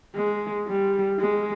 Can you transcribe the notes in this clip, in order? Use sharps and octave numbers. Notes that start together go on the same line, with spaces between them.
G#3
G3
G#3